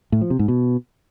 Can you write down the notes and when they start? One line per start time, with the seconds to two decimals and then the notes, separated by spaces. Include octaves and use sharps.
0.12 A2
0.21 F3
0.30 C3
0.39 G#2
0.48 B2